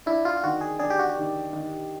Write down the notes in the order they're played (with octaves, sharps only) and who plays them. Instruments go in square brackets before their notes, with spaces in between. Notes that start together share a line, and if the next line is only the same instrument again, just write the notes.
[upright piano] D4 [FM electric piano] E4
[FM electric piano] F4
F4
[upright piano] D#3 [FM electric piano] F#4
[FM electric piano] G#4
[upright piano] D4 [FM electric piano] G#4
[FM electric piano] G4
F#4
G4
[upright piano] D#3
D#3